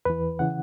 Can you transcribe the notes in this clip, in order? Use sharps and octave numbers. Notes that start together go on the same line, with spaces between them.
E2 E3 B4
C#3 E3 F#5